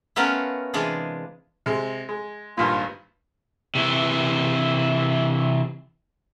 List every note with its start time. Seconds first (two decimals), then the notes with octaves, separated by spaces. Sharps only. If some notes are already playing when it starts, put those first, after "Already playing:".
0.16 A3 B3 C#4 F4 A#4 B4
0.74 C3 E3 G#3 D4 F4 G#4
1.66 C3 G#3
2.09 G#3
2.58 G#1 G2 A#2 F4
3.75 C3 E3